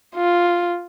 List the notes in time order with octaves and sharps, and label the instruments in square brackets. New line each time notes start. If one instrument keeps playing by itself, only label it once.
[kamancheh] F4